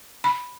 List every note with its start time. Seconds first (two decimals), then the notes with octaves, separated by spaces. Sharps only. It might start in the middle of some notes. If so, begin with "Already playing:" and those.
0.24 B5